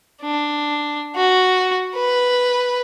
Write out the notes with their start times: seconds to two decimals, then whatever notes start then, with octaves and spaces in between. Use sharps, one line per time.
0.22 D4
1.16 F#4
1.95 B4